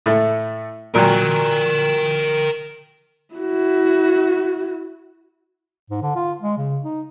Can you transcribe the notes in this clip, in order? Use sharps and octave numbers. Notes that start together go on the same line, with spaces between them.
A2 A3
A#2 F#3 A#4 G5
E4 F#4
G#2
D3
F4
G#3
C#3
D#4